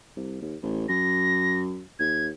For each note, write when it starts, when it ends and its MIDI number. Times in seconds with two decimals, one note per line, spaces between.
0.17 0.38 36
0.42 0.56 39
0.63 0.88 33
0.89 1.83 42
0.89 1.59 94
1.99 2.30 39
1.99 2.26 92